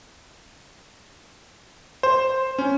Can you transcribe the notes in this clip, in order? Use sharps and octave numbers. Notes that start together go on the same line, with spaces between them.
C5
C#4